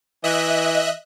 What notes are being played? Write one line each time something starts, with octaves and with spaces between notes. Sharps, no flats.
E3 D#5 E5 F#6